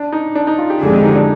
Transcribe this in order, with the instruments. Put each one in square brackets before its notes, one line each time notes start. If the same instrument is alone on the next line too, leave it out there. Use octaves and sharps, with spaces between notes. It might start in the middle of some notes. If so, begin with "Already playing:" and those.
Already playing: [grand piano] D4
D#4
D4
D#4
F4
G4
[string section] F2 D3 G#3 [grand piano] G#4
[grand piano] G4
D#4
D4